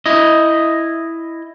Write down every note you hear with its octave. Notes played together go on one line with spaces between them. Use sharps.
E4 D#5